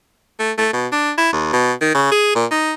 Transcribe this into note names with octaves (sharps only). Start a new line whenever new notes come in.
A3
A3
B2
D4
E4
D#2
B2
D#3
C#3
G#4
A#2
D#4